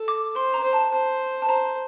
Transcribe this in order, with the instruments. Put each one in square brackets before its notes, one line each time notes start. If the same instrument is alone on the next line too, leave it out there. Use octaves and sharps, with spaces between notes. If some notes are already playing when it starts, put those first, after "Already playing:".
Already playing: [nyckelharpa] A4
[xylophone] D6
[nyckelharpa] C5 [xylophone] C6
[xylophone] A#5
[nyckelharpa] C5
[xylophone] A5
[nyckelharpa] C5 [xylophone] A5
[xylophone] A5
[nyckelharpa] C5 [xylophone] A#5